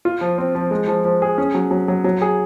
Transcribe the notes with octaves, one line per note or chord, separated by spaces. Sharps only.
F4
F3
C4
F3
G#3
F3
F3
G#4
C#4
F#3
F#3
F#3
F#3
G#4